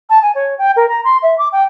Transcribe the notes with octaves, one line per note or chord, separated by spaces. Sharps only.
A5
G#5
C#5
G5
A#4
A#5
C6
E5
D6
G5